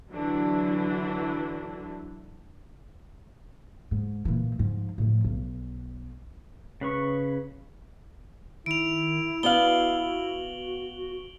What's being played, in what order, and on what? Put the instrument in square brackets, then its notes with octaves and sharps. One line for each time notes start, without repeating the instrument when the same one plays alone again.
[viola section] D3 E3 F#3 D4 E4
[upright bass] G#2
A#2 E3
G#2 F3
A2 F3
B1
[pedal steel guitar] C#3 B4 C#6
[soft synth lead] D#3 [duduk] E4 [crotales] D7 F7
[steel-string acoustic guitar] B3 D5 F5 [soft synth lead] F#4 [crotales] F#7 G7